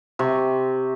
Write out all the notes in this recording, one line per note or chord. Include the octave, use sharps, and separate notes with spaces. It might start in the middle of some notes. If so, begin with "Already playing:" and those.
C3 C#6